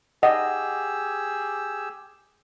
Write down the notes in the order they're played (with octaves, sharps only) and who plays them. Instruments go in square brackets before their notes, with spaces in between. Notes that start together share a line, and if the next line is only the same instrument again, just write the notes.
[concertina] G4 G#4 E6 [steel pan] D#5 [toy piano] F#5